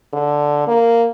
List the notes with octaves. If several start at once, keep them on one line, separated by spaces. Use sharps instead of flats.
D3
A#3